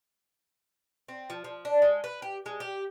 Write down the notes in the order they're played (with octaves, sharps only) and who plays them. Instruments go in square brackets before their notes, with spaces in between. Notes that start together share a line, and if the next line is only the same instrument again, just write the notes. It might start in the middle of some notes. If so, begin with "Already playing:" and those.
[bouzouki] C4
F3
F3
D4
G#3
B4
G4
G#3
G4